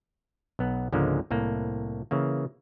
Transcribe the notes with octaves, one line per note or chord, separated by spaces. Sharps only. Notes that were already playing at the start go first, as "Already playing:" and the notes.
B1 B3 F#5
C#2 G#2 D3 F3 G#3 A#3
C2 A2 A#3
C#3 E3 A#3